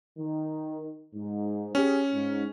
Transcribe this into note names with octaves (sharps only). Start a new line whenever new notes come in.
D#3
G#2
C#4 G4 G#4
G#2